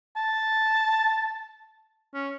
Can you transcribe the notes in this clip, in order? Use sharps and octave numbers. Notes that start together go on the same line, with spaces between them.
A5
C#4